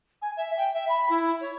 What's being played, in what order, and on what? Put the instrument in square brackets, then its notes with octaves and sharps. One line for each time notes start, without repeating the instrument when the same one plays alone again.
[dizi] G#5
E5
G5
E5
B5
E4
C#5